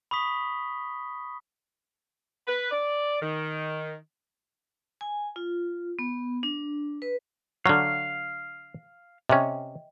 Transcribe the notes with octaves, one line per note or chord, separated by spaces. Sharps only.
B5 C#6 D#6 B6 G7
B4
D5
D#3
G#5
F4
B3
D4
B4
D3 F#3 F5 C#6 F6
C3 C#4 D#5 E5 G5